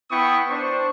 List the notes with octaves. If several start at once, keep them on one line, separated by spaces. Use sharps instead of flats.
B3 E4 G5 B5 C#6 D#6
D4 C5 C#6